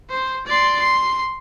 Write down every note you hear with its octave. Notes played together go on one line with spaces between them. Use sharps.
C5
D5 C6
C6